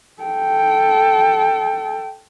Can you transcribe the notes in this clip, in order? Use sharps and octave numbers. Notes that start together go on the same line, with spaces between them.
A4 G5